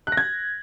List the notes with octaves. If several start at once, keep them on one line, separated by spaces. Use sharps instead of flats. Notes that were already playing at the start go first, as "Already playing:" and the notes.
F#6
A#6
G#6